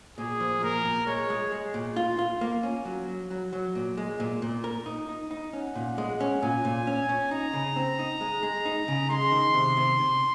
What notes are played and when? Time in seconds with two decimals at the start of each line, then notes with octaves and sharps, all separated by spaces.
0.18 A#2 G#4
0.40 F3
0.63 A#2 A#4
0.85 A#2
1.07 G#3 C#5
1.30 G#3
1.52 G#3
1.74 A#2
1.96 F4
2.19 F4
2.41 A#3
2.63 C#4
2.85 F#3
3.08 F#3
3.31 F#3
3.53 F#3
3.75 A#2
3.97 G#3
4.20 A#2
4.42 A#2
4.64 A#4
4.86 D#4
5.09 D#4
5.31 D#4
5.53 C#4 F#5
5.75 A#2
5.98 G#3
6.20 C#4
6.42 A#2 G#5
6.65 A#2
6.87 C#4
7.09 C#4
7.31 D#4 A#5
7.53 C#3
7.76 C4
7.99 D#4
8.21 G#3
8.43 G#3
8.65 D#4
8.88 C#3
9.10 G#3 C6
9.32 D#3
9.54 C3
9.77 C3
9.99 C3